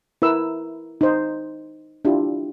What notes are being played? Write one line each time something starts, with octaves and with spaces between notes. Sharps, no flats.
E4 A#4 B4 E6
D#4 C5
D4 E4 F4 G4